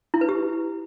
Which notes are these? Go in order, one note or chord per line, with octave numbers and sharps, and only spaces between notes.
E4
B4
G4